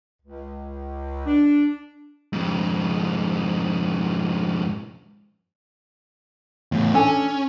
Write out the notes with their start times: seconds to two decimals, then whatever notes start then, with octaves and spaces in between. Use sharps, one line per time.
0.22 C#2
1.26 D4
2.33 F2 G#2
6.72 E2 A2
6.93 C#4 D4 A4 G#5